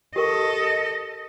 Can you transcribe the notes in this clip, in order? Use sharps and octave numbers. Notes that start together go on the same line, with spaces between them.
G4 A4 A#4 D#5 C#6